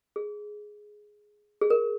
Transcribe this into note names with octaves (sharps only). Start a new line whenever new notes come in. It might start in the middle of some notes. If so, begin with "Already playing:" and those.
G#4
G#4
A#4